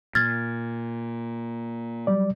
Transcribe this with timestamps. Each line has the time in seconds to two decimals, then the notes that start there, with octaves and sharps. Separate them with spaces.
0.15 A#2 F6 G#6 A6
2.07 F#3 G3 D5